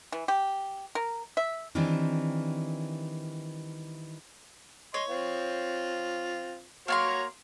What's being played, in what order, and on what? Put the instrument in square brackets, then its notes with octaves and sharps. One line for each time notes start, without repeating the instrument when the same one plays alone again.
[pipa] E3
G4
A#4
E5
[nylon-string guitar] D#3 E3 G3 C4 D4
[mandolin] C#5 [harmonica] D#5 C6
[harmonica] C4 F4
[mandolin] A#3 G#5 C6 [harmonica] F#4 C#5 A#5